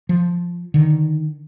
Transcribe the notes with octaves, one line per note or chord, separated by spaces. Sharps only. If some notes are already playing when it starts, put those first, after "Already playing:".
F3
D3 D#3